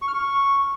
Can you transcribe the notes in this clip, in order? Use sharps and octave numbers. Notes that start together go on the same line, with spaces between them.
C#6
F6
C#6